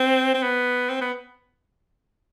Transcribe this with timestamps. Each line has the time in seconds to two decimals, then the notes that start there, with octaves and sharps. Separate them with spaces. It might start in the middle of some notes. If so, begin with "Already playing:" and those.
Already playing: C4
0.34 C4
0.43 B3
0.89 C4
1.01 B3